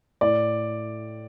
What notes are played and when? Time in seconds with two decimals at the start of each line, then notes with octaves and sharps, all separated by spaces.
0.21 A2 D5